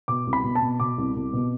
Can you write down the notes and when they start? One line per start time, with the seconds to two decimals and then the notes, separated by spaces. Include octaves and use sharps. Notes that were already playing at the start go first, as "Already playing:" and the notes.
0.08 B2 D6
0.27 C2
0.33 B5
0.44 B2
0.55 A5
0.61 B2
0.80 B2 D6
0.98 C2
1.16 C2
1.33 B2